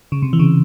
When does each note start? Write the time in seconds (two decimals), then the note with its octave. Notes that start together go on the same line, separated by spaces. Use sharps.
0.12 C#3
0.22 C3
0.33 E3
0.39 C#3